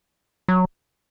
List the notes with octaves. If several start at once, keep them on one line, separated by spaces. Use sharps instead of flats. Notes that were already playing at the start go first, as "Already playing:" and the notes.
F#3